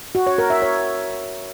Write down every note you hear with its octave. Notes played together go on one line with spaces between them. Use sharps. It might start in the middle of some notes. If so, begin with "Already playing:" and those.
F#4
C#5
A#4
E5
C#5